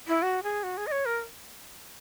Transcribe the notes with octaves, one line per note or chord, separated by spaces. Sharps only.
E4
F#4
G#4
F#4
G#4
D#5
C#5
A#4